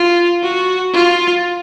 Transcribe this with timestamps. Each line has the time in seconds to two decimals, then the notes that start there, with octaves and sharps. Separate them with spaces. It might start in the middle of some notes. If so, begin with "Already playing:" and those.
Already playing: F4
0.42 F#4
0.93 F4